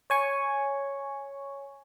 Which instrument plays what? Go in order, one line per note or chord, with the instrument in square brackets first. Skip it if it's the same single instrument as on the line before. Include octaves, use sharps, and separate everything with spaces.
[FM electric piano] C#5 G#5 C#6